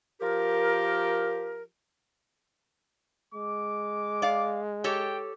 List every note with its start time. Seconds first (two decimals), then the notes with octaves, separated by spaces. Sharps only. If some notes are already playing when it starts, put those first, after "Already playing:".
0.20 F3 G4 A#4
3.34 G#3 D6
4.22 D5 F5
4.84 G4 A4 C#5 G5